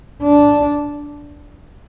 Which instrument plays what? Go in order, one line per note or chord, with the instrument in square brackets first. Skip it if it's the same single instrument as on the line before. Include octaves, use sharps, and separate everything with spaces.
[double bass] D4